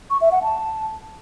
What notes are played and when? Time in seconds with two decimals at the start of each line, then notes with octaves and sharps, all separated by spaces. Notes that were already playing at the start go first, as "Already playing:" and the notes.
0.10 C#6
0.21 E5
0.32 F#5
0.42 A5